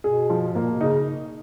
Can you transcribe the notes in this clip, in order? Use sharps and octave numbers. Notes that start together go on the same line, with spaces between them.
B2 G#4
F3
G#2 A#3
A#2
B2
C#3 D#4